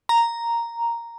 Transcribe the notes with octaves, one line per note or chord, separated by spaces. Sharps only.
A#5